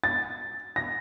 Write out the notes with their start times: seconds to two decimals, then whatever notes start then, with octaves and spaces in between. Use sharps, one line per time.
0.04 A6
0.76 A#6